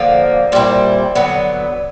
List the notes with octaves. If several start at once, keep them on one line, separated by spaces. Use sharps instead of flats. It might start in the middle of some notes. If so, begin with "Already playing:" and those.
Already playing: D3 F3 A#3
A#2 G3 C4 E4
D3 F#3 B3